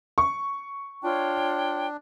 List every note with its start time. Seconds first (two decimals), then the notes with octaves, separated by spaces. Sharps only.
0.18 C#6
1.03 D4 F4 C#5 G5